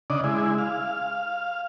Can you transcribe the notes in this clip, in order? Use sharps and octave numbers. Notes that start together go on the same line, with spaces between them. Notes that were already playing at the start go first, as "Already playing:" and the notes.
C#3 D4 D5 D#5
G#3 E4
F5